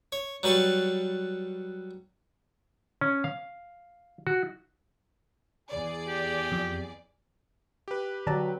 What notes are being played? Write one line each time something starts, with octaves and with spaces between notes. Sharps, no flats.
C#5
F#3 G3 B4 A5 C#6
C#4
F5
F#4
E2 G#4 D5
G4
F2
G4 B4
D3 F#3 D5 A5 A#5